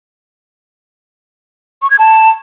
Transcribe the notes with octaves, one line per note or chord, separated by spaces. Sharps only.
C#6
G#6
A5